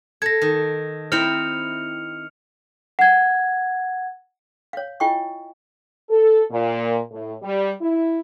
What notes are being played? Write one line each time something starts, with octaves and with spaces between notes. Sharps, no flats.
A4 G#6 A#6
D#3
C4 D#4 E4 C5 F6 C#7 F7
F#5 G#6
C#5 F5
E4 F4 D#5 G5 G#5 C#6
A4
A#2
A2
G3
E4